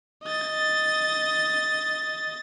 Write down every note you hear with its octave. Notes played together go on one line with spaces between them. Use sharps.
D#5 A6